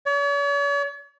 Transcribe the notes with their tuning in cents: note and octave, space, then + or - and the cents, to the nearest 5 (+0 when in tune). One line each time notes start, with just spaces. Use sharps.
C#5 +45